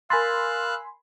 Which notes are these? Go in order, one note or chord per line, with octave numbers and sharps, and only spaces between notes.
A#4 F5 G#5 B5 C6 E6 F#6 A6